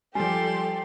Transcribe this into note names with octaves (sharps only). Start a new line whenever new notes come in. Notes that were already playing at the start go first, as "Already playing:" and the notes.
F3 G3 G4 A4 D5 G#5 C6